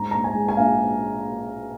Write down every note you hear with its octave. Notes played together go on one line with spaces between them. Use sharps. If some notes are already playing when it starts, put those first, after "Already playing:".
Already playing: G#2 A#5
A#1 A#5
G#5
G#3
G#5
A#1 F5